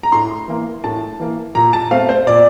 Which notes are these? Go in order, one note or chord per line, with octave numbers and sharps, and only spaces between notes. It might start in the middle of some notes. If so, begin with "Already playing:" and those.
A#5
A2 C6
E3 A#3
A2 A5
E3 A#3
A#2 A#5
A5
A3 C4 F5
C5
A#2 D5